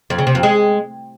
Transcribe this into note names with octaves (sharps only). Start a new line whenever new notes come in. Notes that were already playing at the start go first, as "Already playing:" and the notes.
F2
C#3
C3
F2
G#3